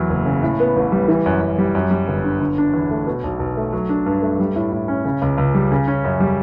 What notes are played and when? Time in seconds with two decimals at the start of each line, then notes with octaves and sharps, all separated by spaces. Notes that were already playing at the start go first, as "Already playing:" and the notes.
Already playing: E2 F#3
0.09 F#1
0.26 C#3
0.43 A2
0.60 B3
0.76 A1
0.92 G3
1.08 E3
1.26 F#2
1.41 F#2
1.58 G3
1.75 F#2
1.91 G3
2.08 G1
2.24 D3
2.41 D3
2.58 D4
2.74 E2
2.91 A3
3.07 B2
3.24 B1
3.39 B1
3.57 A3
3.73 F#3
3.89 D4
4.06 G2
4.22 A3
4.39 G3
4.56 A2
4.72 A2
4.88 C#4
5.05 C#3
5.22 C#2
5.38 C#2
5.55 G3
5.72 C#3
5.88 C#4
6.05 F#2
6.20 G3